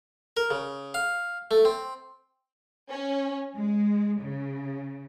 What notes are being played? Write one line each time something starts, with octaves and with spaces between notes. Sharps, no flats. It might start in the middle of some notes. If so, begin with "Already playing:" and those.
A#4
C#3
F5
A3
C4
C#4
G#3
C#3